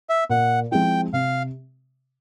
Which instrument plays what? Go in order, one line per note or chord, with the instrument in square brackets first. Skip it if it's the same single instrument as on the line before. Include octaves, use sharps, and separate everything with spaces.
[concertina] E5
[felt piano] A#2 [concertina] F#5
[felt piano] F3 G#3 C4 E4 [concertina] G5
[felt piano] C3 [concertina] F5